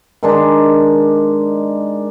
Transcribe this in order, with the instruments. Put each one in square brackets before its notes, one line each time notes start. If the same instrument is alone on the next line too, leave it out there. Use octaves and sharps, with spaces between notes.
[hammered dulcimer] D#3 G#3 D4